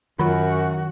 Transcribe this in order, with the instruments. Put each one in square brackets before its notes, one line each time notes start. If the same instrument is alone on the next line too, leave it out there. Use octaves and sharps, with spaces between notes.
[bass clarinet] F#2 [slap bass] D#3 F#3 [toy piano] F4 [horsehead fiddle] F#4